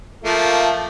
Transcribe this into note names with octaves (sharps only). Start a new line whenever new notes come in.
F3 A3 A#3